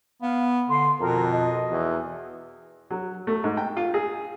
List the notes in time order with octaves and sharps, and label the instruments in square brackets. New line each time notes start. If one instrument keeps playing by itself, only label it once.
[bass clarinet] B3 [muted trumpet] F5
[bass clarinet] D3 [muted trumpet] C6
[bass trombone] F2 [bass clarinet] B2 [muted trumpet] A#4
[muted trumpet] D#5
[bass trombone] E2
[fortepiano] F#3
A3
G#2
G5
F4
G#4